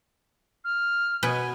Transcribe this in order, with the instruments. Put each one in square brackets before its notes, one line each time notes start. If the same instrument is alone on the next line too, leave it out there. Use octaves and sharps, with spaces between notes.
[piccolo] F6
[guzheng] B2 B4 B5 [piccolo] G#5